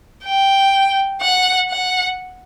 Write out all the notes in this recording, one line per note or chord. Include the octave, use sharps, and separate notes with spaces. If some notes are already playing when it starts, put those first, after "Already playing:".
G5
F#5
F#5